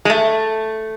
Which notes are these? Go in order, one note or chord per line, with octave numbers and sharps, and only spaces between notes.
G#3
A3